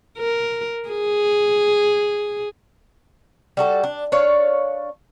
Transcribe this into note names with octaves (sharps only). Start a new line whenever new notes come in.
A#4
G#4
G3 F#4 A4
D4
D4 C#5 F5